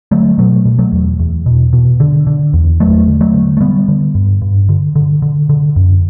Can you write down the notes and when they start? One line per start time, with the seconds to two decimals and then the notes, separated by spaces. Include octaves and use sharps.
0.11 D3 F#3 A3
0.38 B2 F#3 A3
0.65 B2
0.78 F#3 A3
0.92 E2
1.19 E2
1.46 B2
1.73 B2
2.00 D3
2.27 D3
2.53 E2
2.80 E2 F#3 A3
3.07 D3
3.21 F#3 A3
3.34 D3
3.57 A3
3.60 D3 G3 B3
3.88 D3
4.15 G2
4.42 G2
4.69 D3
4.96 D3
5.22 D3
5.49 D3
5.76 F#2